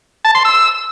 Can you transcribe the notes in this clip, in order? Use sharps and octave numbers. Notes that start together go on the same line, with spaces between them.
A5
C6
E6